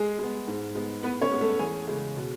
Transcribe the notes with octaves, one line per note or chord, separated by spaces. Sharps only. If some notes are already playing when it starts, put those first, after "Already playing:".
Already playing: G#3 G#4
G#3 B3
G#2
G#3 B3
A2 B3 B4
C#4 C#5
G#3 B3
A3 A4
E2 G#4 G#5
C#3 G#3
B2